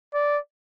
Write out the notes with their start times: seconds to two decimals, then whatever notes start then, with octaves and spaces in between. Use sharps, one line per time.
0.14 D5